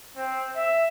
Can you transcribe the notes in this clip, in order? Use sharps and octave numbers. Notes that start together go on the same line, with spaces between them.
C4
E5